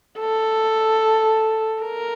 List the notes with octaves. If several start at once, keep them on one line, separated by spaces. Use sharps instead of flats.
A4
A#4